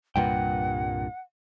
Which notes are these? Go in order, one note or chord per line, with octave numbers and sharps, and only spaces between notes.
C2 G2 A#2 B4 F#5 G5